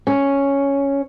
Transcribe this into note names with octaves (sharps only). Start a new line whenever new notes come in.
C#4